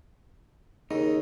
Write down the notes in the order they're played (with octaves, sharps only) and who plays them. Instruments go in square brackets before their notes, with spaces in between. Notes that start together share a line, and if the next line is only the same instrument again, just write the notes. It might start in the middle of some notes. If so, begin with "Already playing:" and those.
[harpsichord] D#2 C#3 [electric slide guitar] D#4